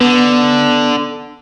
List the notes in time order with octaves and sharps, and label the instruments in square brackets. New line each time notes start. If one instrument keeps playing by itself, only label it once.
[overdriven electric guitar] D3 [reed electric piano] B3